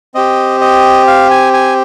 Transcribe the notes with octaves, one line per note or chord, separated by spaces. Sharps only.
C4 G4 D#5
D#5
F5
G#5
G#5